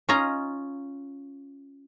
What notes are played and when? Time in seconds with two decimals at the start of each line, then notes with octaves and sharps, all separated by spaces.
0.09 C#4 F4 D#5 A#5